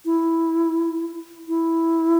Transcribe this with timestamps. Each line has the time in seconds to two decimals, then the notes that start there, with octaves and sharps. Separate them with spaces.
0.05 E4
1.48 E4